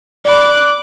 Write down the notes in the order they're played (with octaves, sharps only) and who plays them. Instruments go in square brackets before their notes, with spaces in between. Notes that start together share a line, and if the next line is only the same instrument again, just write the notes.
[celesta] D5 B5 [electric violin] D6 F#6